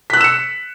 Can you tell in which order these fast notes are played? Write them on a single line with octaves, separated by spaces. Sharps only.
B6 F#6 E6 E7 C#7